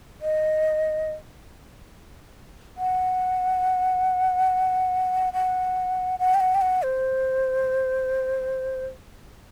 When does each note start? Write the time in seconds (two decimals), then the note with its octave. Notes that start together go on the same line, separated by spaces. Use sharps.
0.22 D#5
2.77 F#5
5.33 F#5
6.19 F#5
6.35 G5
6.40 F#5
6.55 G5
6.61 F#5
6.83 C5